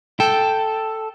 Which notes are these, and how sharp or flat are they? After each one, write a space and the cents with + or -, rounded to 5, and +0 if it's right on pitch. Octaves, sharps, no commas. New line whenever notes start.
A4 +0 G5 +0